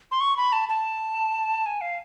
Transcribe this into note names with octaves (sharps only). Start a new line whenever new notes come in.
C6
C#6
B5
A5
A5
G#5
F5